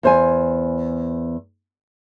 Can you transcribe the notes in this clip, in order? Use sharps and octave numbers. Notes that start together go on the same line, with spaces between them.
E2 C5 G#5